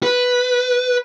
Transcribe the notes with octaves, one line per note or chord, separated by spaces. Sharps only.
B4